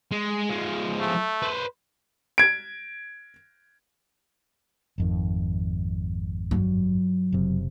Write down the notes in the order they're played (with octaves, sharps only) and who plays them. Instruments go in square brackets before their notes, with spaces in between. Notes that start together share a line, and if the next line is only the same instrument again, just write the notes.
[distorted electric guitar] G#3
F3 G#3
[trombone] A3
[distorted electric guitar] B4 C5
[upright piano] G#6 D7
[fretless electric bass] G#1 F2 D#3
[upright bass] G2 F#3
[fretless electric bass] F#1 C3